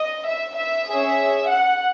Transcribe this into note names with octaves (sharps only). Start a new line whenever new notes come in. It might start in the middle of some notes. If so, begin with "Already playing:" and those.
Already playing: D#5
E5
E5
C#4 G#4
F#5